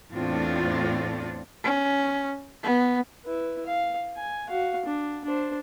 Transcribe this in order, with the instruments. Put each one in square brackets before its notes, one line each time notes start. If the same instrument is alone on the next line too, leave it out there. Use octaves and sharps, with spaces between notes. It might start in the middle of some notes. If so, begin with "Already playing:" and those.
[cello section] E2 A2 C4 D4 F4 A4
[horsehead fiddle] C#4
B3
[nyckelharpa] E4 B4
F5
G#5
F#4 F5
D4
D4 C5